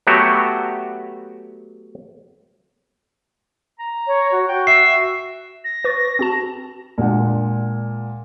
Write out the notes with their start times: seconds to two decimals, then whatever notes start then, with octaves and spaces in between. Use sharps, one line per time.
0.07 F#3 A3 B3 F#4 G4
3.79 A#5
4.07 C#5
4.32 F#4
4.49 F#4 G5
4.67 E5 C7
5.64 A#6
5.84 B4 C#6 A6
6.19 C4 F#4 A5
6.98 A#2 G#3 D4 F#5